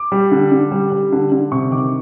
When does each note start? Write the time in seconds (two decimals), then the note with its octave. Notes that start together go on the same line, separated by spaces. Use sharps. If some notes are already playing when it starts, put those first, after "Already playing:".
Already playing: D6
0.12 G3
0.32 D3
0.52 D3
0.71 G3
0.92 G3
1.12 D3
1.32 D3
1.52 C3 C#6
1.71 D#3 D6